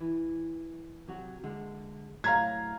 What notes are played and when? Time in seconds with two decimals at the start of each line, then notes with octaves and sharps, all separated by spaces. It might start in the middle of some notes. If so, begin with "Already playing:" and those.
0.01 E3
1.08 C3 F#3 F#4
1.44 D3 G#3
2.24 A2 F#3 C#5 F5 A#5 G#6